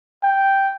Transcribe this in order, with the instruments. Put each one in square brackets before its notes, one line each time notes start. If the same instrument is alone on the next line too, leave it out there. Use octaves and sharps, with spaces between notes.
[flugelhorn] G5